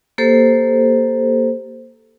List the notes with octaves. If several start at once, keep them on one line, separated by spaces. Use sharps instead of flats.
A#3 G4 A4 C5